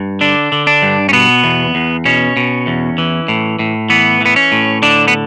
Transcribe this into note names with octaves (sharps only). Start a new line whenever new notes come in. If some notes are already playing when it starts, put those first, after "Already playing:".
Already playing: G2
D3 D4
D3
D4
G2
C#4
B2 B3
E2
E2
B2 C#4
B2
E2
E3
A2
A2
E3 B3
E3 B3
C#4
A2
D3 D4
B3